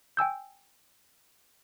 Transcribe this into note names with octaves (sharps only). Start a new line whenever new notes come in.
G5 G#5 E6 G6